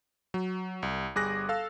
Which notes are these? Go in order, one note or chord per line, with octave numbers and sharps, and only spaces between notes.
F#3
C2
G1 G3 G#4 D6 F#6 A#6
A4 F5 E6